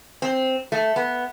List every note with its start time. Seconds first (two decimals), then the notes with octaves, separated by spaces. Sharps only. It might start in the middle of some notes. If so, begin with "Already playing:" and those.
0.22 C4
0.72 A3
0.96 B3